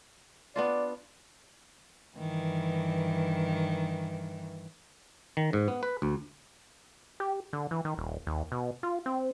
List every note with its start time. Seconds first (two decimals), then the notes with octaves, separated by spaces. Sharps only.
0.56 B3 D4 F4 D5
2.17 G2 D#3 E3
5.37 D#3
5.53 G#2
5.68 B3
5.83 B4
6.02 D2
7.20 G4
7.53 D3
7.71 E3
7.85 D#3
7.97 D#1
8.27 D#2
8.52 B2
8.83 F4
9.06 C4